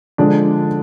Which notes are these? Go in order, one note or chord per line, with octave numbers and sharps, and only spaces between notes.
D3 F3 G#3 D4